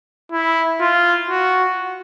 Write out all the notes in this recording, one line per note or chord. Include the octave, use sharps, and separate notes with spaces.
E4
F4
F#4